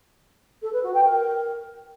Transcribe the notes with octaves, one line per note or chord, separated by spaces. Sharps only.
A4
B4
F#4
G5
A#4